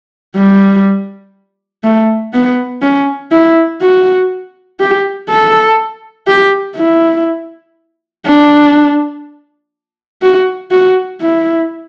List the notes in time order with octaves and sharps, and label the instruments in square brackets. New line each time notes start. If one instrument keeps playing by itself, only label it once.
[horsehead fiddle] G3
A3
B3
C#4
E4
F#4
G4
A4
G4
E4
D4
F#4
F#4
E4